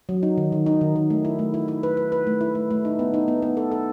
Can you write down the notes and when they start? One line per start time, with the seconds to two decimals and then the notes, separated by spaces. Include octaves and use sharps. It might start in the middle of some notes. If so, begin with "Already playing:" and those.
0.09 F#3
0.23 D#4
0.37 D#3
0.52 D#3
0.66 D#4
0.81 D#3
0.96 D#3
1.10 A3
1.25 E4
1.39 A3
1.54 E4
1.68 E4
1.83 B4
1.97 B4
2.12 B4
2.27 A3
2.41 E4
2.55 A3
2.71 A3
2.85 D#4
2.99 B3
3.14 D#4
3.28 B3
3.42 B3
3.57 A4
3.72 A4